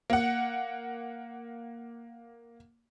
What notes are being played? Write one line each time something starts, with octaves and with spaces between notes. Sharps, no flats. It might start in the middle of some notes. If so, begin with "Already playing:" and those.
A#3 F#5